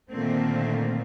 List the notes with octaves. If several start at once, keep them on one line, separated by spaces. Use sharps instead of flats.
A#2 D3 D#3 A3 A#3 C4